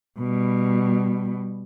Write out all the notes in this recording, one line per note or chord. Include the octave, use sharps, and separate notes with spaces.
B2 G3